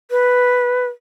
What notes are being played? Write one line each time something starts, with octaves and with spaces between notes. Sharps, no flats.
B4